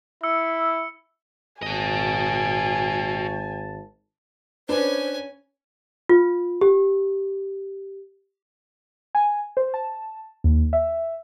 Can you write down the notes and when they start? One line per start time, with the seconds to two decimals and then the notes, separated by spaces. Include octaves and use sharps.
0.24 E4 E6 C#7
1.63 G#1 F#4 D#5 G#5 A5
4.69 C#4 D4 B4 C5 G#5
6.09 F4
6.61 G4
9.15 G#5
9.57 C5
9.74 A5
10.44 D#2
10.73 E5